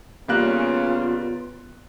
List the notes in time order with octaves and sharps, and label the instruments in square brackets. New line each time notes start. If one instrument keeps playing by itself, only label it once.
[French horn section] C#3 [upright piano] G3 A#3 F#6 [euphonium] B3 [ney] F4